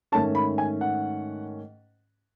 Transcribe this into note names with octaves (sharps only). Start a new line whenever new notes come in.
G#2 D#3 A3 C#4 A5
B5
G#5
F#5